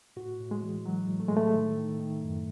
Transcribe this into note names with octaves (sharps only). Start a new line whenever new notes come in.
A2 F#4
A2
G#3
E3
E3 F#3
A2
A3
A2 G#3
A3
D#3
D#3
D#3
F#2